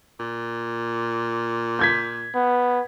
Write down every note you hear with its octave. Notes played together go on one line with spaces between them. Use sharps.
A#2
G6 G#6 B6
B3